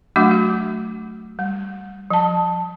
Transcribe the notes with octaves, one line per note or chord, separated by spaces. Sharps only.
F#3 A3 D4 F#4 F#5 D6
F#4
G3
F3 A5